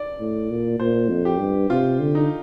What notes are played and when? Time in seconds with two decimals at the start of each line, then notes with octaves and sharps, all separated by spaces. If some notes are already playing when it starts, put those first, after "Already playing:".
Already playing: D5
0.20 A2
0.50 A#2
0.80 A#2 C5
1.09 F2
1.25 G4
1.39 G2
1.70 C3 F4
2.00 D3
2.15 D#4